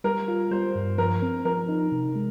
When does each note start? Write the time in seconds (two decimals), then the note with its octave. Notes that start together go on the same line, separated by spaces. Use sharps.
0.04 G3 A#4
0.28 F4
0.51 G3 C5
0.75 G2
0.98 F3 A#4
1.22 C4
1.45 F3 A#4
1.68 D#4
1.92 C3
2.16 G#3